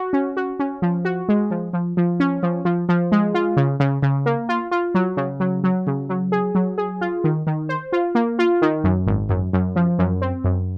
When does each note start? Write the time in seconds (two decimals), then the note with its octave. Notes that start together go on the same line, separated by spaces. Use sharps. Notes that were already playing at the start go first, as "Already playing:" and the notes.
Already playing: F#4
0.13 C#4
0.37 F#4
0.60 C#4
0.82 F3
1.05 F#4
1.29 G#3
1.51 F3
1.73 F3
1.97 F3
2.20 C#4
2.43 F3
2.65 F3
2.89 F3
3.12 G#3
3.34 F4
3.57 C#3
3.80 C#3
4.03 C#3
4.26 A#3
4.49 F4
4.71 F4
4.95 F#3
5.17 C#3
5.40 F#3
5.64 F#3
5.87 C#3
6.09 F#3
6.32 G#4
6.55 F#3
6.78 G#4
7.01 F4
7.24 D#3
7.47 D#3
7.69 C5
7.93 F4
8.15 A#3
8.39 F4
8.62 D#3
8.84 F#2
9.07 G#1
9.29 F#2
9.53 F#2
9.76 F3
9.99 F#2
10.22 C4
10.44 F#2